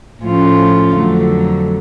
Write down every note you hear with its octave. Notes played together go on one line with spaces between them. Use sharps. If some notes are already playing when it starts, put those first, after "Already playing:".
A2 F3 A3 C#4 F4
F2 D3 F#3 A3